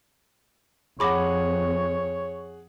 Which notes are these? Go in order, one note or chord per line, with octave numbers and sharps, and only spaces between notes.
F2 G#4 C#5 F#5 B5 D6 A#6